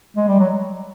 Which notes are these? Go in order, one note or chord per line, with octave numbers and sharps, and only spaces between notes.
G#3
G3
F#3